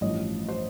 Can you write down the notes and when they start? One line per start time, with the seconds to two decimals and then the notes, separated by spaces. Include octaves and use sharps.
0.01 A1 G2 F3 D#5
0.48 C5